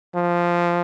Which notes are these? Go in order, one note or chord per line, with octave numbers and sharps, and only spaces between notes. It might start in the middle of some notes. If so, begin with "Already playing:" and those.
F3